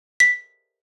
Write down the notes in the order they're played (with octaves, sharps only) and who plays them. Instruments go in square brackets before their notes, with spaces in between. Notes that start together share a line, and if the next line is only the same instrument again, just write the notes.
[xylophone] B6